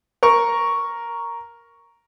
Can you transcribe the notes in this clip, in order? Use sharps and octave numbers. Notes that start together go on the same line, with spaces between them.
A#4 C#6